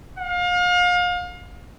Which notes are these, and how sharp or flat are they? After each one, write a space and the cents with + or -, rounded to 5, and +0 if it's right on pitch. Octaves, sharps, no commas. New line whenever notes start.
F5 +35